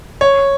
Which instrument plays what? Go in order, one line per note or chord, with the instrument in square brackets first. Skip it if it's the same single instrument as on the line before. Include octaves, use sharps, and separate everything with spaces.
[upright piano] C#5